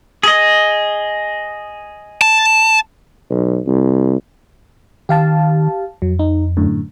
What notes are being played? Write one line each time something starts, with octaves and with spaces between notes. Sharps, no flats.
G#4 D#5
A5
B1
C2
D#3 G4 F5 A5
F2 F#3
D#4
F#2 A2 D3